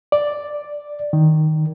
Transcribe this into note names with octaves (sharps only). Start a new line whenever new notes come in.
D5
D#3